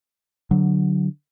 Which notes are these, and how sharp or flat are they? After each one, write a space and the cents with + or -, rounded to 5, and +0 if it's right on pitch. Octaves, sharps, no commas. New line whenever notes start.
D3 +0 F#3 +0